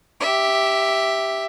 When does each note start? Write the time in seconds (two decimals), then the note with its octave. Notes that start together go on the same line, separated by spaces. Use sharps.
0.20 G4 E5